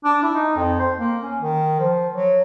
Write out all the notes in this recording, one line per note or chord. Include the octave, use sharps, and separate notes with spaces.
D4
E4
D#4
F2
C5
A#3
C#4
D#3
F3
F#3